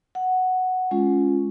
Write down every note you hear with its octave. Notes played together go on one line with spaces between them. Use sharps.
F#5
G#3 C#4 F4